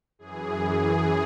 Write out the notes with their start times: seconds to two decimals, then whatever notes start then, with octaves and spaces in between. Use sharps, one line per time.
0.19 F#2 E3 G#4
0.61 G#4